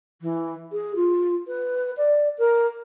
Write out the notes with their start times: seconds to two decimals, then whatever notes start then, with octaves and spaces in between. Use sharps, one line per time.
0.21 E3
0.72 G#4
0.96 F4
1.47 B4
1.97 D5
2.38 A#4